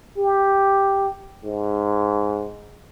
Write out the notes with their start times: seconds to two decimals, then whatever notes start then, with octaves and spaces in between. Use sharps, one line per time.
0.18 G4
1.45 G#2